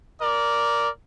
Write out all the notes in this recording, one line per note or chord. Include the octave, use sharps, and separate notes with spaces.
A#4 D5